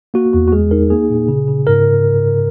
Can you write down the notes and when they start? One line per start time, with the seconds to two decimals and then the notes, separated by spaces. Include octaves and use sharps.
0.14 A#3 F#4
0.33 E2 F#4
0.48 F#4
0.52 G#3 G#4
0.71 D#4 A#4
0.90 A#3 G#4
1.10 A#2
1.28 C#3
1.48 C#3
1.67 G#2 A#4